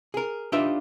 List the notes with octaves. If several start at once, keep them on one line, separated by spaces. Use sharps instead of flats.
G#4 A#4
D4 D#4 F4 G4 B4 E5